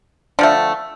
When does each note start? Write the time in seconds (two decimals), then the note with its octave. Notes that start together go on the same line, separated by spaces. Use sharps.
0.39 D3 F3 A3 D4